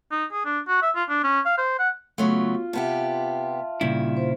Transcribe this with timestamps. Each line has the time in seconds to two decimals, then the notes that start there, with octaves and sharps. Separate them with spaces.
0.11 D#4
0.32 G#4
0.46 D4
0.68 F#4
0.82 E5
0.96 F4
1.09 D4
1.23 C#4
1.45 F5
1.58 C5
1.79 F#5
2.18 C#3 F#3 A3 B3 F4 F#4
2.73 C3 B3 G4 E5 A5
3.81 G2 A#2 C#3 E4
4.17 C5